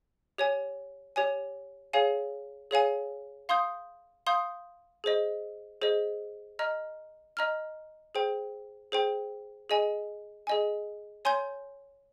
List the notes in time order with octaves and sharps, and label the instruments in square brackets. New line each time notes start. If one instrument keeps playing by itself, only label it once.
[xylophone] G4 C#5 G#5
G4 C#5 G#5
G#4 C#5 F5 G#5
G#4 C#5 F5 G#5
F5 C6 D#6 G6
F5 C6 D#6 G6
G#4 C5 D#5
G#4 C5 D#5
D#5 A#5 F6
D#5 A#5 F6
G#4 C5 G5
G#4 C5 G5
G#4 D#5 G#5
G#4 D#5 G#5
C#5 G#5 C6 G6